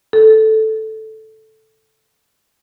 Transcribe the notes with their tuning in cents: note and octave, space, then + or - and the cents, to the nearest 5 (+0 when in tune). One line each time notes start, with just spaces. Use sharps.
A4 -5